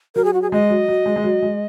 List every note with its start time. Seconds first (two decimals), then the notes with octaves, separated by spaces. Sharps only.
0.15 F#3 A#4
0.25 G#4
0.33 F#4
0.42 G#4
0.52 G#3 D#5
0.70 F#3
0.88 F#3
1.06 G#3
1.16 G#3
1.24 F#3
1.42 G#3